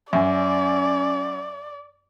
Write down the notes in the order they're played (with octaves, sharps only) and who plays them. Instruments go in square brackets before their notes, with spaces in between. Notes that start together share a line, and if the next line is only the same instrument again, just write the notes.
[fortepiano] F#2 [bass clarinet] C#4 [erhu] D5 [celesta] E5 G#5